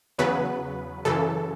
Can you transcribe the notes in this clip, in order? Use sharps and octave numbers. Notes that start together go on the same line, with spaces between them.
E2 C#3 F#3 B3 B4
F#2 C#3 E3 A4